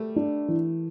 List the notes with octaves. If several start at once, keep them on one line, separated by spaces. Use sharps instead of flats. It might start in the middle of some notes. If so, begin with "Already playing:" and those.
Already playing: G3 A3
D4
E3